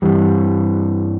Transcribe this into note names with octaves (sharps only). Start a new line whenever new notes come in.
G2 E3 G3